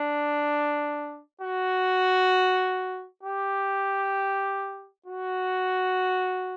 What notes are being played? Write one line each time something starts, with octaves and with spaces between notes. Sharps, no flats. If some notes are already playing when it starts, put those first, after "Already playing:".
Already playing: D4
F#4
G4
F#4